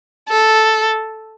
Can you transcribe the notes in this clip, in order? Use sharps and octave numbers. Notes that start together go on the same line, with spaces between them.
A4